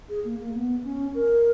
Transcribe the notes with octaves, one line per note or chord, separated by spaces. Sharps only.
G#4
A#3
A#3
B3
C#4
A#4